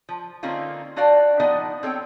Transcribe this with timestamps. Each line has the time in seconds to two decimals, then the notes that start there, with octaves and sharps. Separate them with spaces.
0.09 F3
0.43 D3 A#3 C4 C#4 D#4 F4
0.96 D4 F#4 D5 F5 G5
1.40 F3 B3 D4 D#4 D5 D#5
1.83 C4 A4 C#5 G5